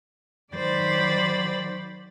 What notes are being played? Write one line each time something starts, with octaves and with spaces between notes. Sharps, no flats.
D#3 F#3 C5 D5 B5 A6